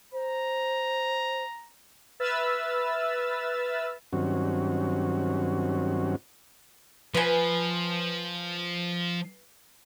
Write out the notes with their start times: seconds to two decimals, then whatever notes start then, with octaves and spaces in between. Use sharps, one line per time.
0.13 C5 A#5
2.20 B4 E5 B5 E6 F6 A6
4.13 G2 D#3 F#3 C4 C#4 F#4
7.15 F3 B4 G#5